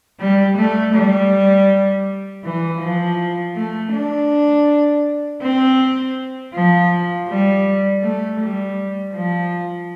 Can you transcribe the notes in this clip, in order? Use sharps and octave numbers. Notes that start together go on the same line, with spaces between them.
G3
A3
G3
E3
F3
A3
D4
C4
F3
G3
A3
G3
F3